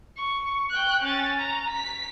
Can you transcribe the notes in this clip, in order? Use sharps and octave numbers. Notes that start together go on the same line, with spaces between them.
C#6
G5 F#6
C#4 A6
A#5
B6